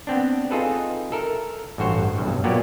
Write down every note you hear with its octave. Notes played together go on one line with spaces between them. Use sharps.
B3 C4 D4
C4 D#4 F4 G#4 A4 B4
A4 A#4 E5
A1 G2 F#4 C5 C#5
B1 G2
A#2 F#3 A#3 B3 G4 D5